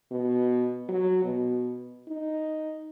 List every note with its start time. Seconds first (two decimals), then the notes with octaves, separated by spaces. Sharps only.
0.11 B2
0.89 F#3
1.24 B2
2.08 D#4